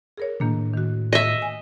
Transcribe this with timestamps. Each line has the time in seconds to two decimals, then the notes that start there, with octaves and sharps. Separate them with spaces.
0.17 G#4 A#4 C#5
0.40 A2 D#3 A#3 D4
0.73 D#3 F#4
1.13 A3 D#5 E5
1.42 G#5